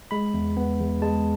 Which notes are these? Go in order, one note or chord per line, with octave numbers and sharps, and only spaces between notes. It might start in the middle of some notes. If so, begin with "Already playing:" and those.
G#3 B5
E2
B3
E2
G#3 A5